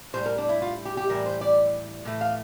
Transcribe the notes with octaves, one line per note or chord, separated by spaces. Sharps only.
A2 G3 C5
A#4
D4
E4
F4
G4
G4
A2 E3 G3 A#4
C5
D5
A2 E3 A3
F5